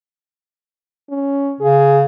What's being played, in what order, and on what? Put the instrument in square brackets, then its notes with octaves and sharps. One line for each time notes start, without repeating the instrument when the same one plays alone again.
[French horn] C#4
[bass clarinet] C#3 [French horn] G#4